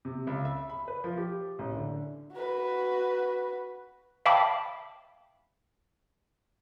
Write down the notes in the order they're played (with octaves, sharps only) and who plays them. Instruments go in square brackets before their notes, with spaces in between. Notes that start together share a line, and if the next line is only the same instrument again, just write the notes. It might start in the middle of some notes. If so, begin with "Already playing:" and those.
[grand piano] C3
C#2
E5
B5
B4
F3
G4
A1
D3
[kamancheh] F#4 B4
[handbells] E5 F5 G5 A5 B5 D6